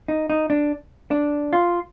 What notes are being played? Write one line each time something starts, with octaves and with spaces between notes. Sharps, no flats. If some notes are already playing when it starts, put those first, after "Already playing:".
D#4
D#4
D4
D4
F4